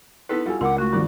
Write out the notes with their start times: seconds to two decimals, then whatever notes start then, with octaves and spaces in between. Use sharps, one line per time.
0.29 B3 D#4 E4 A4 B4
0.46 G3 F4 F#4 A4 G#5
0.61 C#2 A#4 F#5 C6 D6
0.78 A3 F#4
0.93 G2 D#3 F3 D5